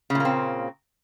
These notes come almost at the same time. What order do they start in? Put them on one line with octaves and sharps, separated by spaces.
C#3 A#2 A#3 C4